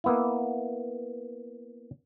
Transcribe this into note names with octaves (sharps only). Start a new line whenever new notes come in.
A#3 B3 E4